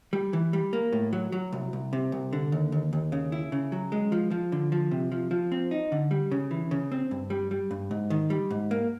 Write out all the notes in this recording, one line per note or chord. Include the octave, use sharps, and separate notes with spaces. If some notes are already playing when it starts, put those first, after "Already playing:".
G3
E3
G3
A#3
A2
F#3
F#3
C2
C2
C3
C2
D3
D#2
D#2
D#2
C#3
E4
C#3
F#3
G#3
F3
F3
D3
F3
C3
F3
F3
C4
D#4
D3
G3
C#3
E3
C#3
C4
G2
G3
G3
G2
G#2
D#3
G3
G#2
A#3